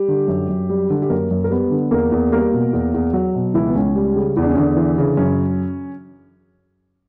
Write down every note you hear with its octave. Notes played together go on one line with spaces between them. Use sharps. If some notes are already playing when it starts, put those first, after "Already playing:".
Already playing: G3 G4
D3
F#2
F#2
G3
D3
G4
F#2 A#3 A#4
F#2
A#4
G3 B3 B4
D3
E2 A#3 A#4
E2
G3 A#3 A#4
B2
E2
E2
F#3 F#4
B2
C#2 E3 E4
B3
C#2 C#4
G3
C#3
E2 E4
D4
C#4
E2 D3 D4
E3
C#3
F#2 C#4